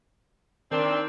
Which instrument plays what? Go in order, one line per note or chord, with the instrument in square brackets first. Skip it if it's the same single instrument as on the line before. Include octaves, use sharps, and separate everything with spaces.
[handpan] D#3 A#4 [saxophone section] C4 [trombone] D4